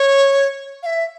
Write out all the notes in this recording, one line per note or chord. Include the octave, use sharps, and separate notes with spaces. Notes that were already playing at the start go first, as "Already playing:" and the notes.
Already playing: C#5
F5
E5